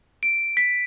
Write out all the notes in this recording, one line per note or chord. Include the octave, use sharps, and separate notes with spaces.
D7
B6